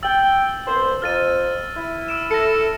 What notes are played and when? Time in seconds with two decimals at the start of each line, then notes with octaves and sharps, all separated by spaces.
0.03 G5 E6 A6 F#7
0.66 C2 B3 C5
1.02 F2 F6 A6 D#7
1.76 E4
2.08 E6 D7 E7
2.31 A4 A#6 C#7